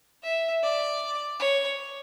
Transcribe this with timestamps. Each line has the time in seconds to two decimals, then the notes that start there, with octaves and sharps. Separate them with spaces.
0.23 E5
0.63 D5
1.40 C#5